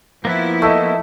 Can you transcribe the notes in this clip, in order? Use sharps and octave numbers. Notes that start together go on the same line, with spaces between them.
F3 A#3 B3 E4 B4
A3 D#5 E5 E6